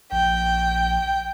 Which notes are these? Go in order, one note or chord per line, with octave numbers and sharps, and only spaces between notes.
A#1 G5